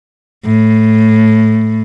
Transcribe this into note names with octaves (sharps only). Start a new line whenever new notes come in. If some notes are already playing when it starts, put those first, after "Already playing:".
A2